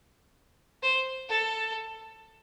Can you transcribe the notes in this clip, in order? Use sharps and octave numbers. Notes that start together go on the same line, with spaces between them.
C5
A4